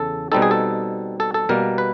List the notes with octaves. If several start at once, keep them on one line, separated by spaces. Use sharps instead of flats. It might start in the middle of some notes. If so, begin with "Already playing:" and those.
Already playing: E2 C#3 A4
B2 G3 C4 D#4 A4
G#4
A4
A4
A4
B2 G3 A#3 A#4
B4